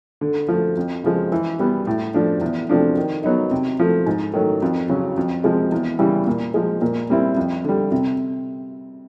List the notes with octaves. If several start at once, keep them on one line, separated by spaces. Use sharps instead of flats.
D3
F3 A3
F2
C#3 F3 G#3
E3
G3 B3
A2
F3 A3 D4
E2
C3 F3 A3 D4
D#3
F#3 B3 D#4
C3
F3 A3
G#2
D#3 F#3 A3
F2
C#3 F#3
F2
C3 F3 G#3
E2
C#3 E3 G3
A#2
F3 G#3
A#2
G3 C4 E4
F2
D3 G3
C3